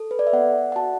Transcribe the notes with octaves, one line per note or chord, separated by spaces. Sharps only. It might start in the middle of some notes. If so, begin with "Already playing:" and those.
Already playing: A4
B4
D5
E5
B3 F#5
F#5
F#4 A5